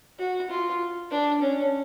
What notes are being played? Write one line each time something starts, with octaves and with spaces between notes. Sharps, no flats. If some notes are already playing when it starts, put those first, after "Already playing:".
F#4
F4
D4
C#4